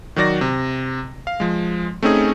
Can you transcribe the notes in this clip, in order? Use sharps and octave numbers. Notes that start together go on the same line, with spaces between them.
D#3 F#3 F#4 D5 A#6
C3
F5
F3 G#3
A3 C4 C#4 D#4 G#4